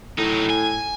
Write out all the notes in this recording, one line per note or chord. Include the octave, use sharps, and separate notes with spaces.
A2 F#3 D#4
G#5